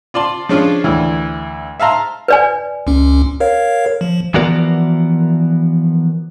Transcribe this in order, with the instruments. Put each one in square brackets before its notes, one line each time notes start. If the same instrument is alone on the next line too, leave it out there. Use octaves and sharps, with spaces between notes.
[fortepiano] F4 D5 A5 C6
F3 G#3 C#4 D4 F4
D2 E3
E5 F5 A5 A#5 C6
[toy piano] B4 D5 G#5
[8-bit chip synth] C#2 C#4
A#4 C#5 F5
F3
[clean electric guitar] E3 F3 B3 F#4 A#4 D5